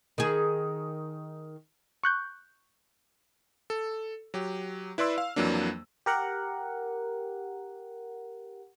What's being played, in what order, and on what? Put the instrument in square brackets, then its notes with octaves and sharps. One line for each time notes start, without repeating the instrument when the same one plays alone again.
[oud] D#3 G#4
[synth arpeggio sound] C#6 F#6 G6
[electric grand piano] A4
F#3 G4
E4 B4 D5 C6 E6
F5
F2 E3 F#3 A#3 D4
[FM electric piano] G4 A#4 F#5